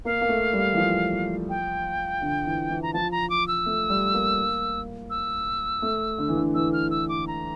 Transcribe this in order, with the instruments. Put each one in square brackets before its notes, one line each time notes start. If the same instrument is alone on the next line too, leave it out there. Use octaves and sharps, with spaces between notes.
[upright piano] A#3 [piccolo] F5
[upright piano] A#3
A3
G3
E3
F3
[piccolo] G5
[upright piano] D3
E3
E3
[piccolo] A#5
[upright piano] F3 [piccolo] A5
[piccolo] A#5
D6
E6
[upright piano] A3
G3
A#3
[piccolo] E6
[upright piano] A3
D3
E3
D3
[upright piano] E3 [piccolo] E6
[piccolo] F6
E6
D6
A#5